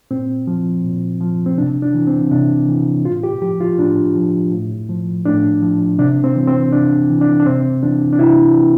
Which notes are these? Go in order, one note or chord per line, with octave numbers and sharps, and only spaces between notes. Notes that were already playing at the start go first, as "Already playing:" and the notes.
A#2 C4
F3
A#2
F3
C4
C3 D4
D4
E3
C4
C3 D4
E3
A2 F4
G4
F3 G4
F4
A2 D4
F3
A2
F3
A2 D4
F3
C3 D4
C4
E3
C4
C3 D4
E3
D4
D4
C3 C4
E3 D4
D4
C3 E4
E3